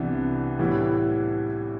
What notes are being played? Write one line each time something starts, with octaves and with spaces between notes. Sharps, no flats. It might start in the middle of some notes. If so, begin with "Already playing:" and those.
Already playing: C2 C3 E3 B3 D4
A2 E3 G3 B3 E4